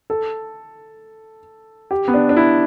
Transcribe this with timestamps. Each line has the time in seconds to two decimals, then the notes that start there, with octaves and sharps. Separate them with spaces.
0.10 A4
1.91 G4
2.08 B3
2.14 D4
2.29 D4
2.37 E4